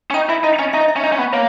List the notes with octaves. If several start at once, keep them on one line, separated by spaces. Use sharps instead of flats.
C#4
D#4 G5
E4 E5
D#4 D#5
C#4 D#5
D#4 E5
D#5
E5
C#4
D#4
C#4
B3
A#3 C#5